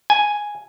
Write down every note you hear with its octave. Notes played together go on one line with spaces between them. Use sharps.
G#5